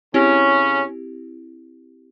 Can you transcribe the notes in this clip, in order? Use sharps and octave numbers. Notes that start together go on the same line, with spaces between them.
C#3 C4 C#4 E4 G4